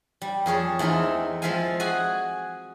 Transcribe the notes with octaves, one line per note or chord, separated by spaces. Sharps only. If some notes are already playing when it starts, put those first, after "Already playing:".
G3
F2 G#4 C#5 A5
E2 A3 C4 D#4 E4
F3 G#3 A4 E5 F5 G#5
F#4 G#4 F#5 G#5